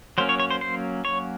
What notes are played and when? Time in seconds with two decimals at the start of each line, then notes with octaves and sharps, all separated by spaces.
0.18 F#3 A#3 C#4 C5
0.29 C#5
0.40 C#5
0.51 C5
0.61 C5
1.05 C#5